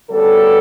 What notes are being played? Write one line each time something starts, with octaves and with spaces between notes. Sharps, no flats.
D2 C#3 G3 B3 A4